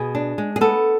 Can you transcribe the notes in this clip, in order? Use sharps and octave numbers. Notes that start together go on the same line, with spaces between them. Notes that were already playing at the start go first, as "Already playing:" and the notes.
Already playing: B2 G#4
D4
G#3
G#4
B3 A4